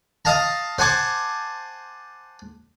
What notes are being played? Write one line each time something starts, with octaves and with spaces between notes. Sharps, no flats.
D#5 F5 A5 A#5
C5 F#5 G#5 A5 D6